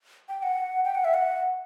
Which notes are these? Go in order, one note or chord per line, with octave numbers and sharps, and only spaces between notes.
G5
F#5
G5
F#5
E5
F#5